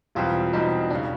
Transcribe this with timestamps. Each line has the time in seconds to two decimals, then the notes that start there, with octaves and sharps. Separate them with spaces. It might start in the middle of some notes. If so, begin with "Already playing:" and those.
0.15 E1 E2 B2 G3 C4 F4
0.53 E1 E2 B2 G3 C4 D#4
0.90 E1 D4
0.95 C#3